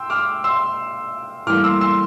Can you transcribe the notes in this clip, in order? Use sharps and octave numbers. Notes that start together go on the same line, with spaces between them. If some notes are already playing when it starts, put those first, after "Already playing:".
Already playing: G5 C6 E6
D6 F6
C6 E6
A2 E3 G3 A#3 D6 F6
C6 E6
C6 E6